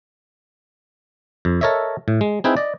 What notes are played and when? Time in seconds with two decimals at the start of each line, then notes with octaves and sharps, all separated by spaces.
1.45 F2
1.61 A4 A#4 C#5 D#5 E5
2.08 A2
2.21 G#3
2.44 C4 D#4 E4 G#4 B4 G5
2.57 D5 D#5